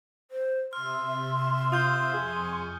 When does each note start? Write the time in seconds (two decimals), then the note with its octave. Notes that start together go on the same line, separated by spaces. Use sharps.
0.31 C5
0.73 C3 E5 C6 E6 F6
1.72 F4 D#6 G6 G7
2.14 F2 G#4 G#5 C#6